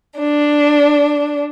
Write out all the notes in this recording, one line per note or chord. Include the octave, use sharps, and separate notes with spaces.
D4